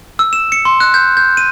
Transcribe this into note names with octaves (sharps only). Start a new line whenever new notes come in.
E6
E7
C#7
C6
F#6
G6
G6
D#7